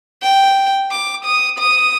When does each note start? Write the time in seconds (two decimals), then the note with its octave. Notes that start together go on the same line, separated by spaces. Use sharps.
0.22 G5
0.91 D6
1.25 D#6
1.59 D#6